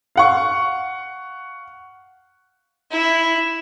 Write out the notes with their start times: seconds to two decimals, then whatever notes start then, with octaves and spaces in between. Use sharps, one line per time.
0.16 F5 F#5 C#6
2.91 E4